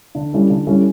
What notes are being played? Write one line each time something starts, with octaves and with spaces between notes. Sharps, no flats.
D3
G3 C#4 E4 A4
D3
G3 C#4 E4 A4